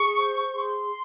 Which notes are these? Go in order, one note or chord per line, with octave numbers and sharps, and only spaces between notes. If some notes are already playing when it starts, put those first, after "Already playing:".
Already playing: G#4 C#6
C5
G#4 C6